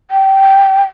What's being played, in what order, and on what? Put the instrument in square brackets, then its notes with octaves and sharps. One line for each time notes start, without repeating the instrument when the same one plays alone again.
[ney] G5